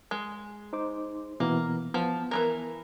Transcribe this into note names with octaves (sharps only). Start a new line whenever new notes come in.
G#3
D#4 C5 D6
B2 E3 A#3 B3
F3 B3
E3 G#3 A#4